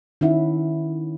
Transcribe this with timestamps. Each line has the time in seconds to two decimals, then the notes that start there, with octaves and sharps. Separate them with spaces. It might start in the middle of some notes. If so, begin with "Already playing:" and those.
0.21 D#3 C#4 E4 E5 F#5